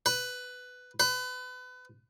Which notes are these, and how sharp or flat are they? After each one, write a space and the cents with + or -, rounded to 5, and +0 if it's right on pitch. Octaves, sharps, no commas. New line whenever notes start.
B4 +10
B4 +30